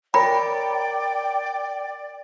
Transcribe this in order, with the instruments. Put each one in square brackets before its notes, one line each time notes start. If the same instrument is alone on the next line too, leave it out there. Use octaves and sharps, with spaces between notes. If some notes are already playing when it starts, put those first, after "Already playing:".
[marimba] A#4 C#5 A#5 [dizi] D5 [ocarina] G5 [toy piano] B5